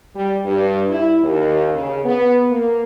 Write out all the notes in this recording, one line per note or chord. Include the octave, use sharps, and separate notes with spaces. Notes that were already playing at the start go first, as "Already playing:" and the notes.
G3
G2
E4
D#2
C#3
B3
A#3